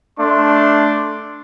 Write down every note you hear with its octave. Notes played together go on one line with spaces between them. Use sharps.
A3 D4 C6